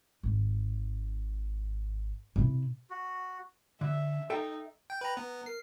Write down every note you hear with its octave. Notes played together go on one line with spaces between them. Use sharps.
G#1
C3 E4
F#4
D3 E5
D#4 A4 E5 G5
G5
B4 G5 A#5
B3 A#5
A#4 C7